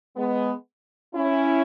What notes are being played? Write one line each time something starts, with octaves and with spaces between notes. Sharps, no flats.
G#3 B3
C#4 E4